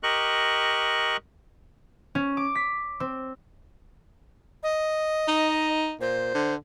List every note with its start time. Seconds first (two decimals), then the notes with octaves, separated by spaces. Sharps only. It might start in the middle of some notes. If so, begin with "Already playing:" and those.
0.03 G4 A#4 D#5 C#6 F#6
2.15 C#4
2.37 D6
2.55 B6
3.00 C4
4.63 D#5
5.28 D#4
6.01 A#2 C5
6.34 D3